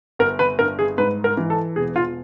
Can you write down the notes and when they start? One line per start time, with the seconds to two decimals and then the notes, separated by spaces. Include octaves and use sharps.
0.19 G1 A#4
0.39 B4
0.59 G2 A#4
0.79 G#4
0.98 G#2 B4
1.24 A#4
1.37 E3
1.50 A4
1.76 E1 G#4
1.96 F4